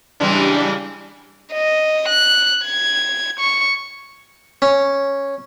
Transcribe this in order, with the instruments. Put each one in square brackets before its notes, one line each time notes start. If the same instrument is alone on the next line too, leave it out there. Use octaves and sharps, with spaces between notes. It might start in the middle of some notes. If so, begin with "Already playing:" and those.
[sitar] C#3 E3 G#3 [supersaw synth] G3 D4
[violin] D#5
F#6
G#6
C#6
[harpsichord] C#4